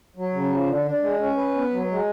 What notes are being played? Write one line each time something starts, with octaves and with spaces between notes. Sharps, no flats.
F#3
C#3
F3
D3
D4
G#3
C#4
B4
B3
F#3
G#3